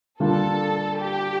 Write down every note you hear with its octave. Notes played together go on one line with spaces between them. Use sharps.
D3 G3 A#3 D4 F4 A4
G4